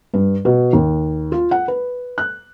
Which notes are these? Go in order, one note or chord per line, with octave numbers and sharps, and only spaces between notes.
G2
B2
D#2
F4
F#5
B4
F#6